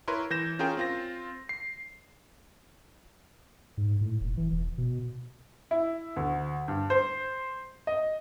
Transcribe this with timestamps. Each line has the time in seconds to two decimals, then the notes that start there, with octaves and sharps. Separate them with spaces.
0.08 E4 A#4 B4 C#5 C6
0.30 E3 G6 A#6 E7
0.59 C#4 F4 G#4 A#4 G5
0.77 C4 F4 A#6
1.49 C7
3.77 G#2
4.01 A2
4.21 F1
4.37 E3
4.52 E1
4.78 B2
5.71 E4
6.16 D2
6.68 G2
6.90 C5
7.87 D#5